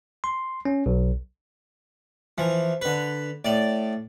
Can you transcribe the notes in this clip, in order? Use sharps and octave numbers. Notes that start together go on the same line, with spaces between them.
C6
C#4
B1
E3 F3
D3 B4
A2 D5